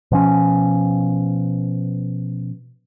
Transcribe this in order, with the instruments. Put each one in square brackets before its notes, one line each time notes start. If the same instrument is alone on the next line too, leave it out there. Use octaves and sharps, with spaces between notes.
[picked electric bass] B2 F3 C#4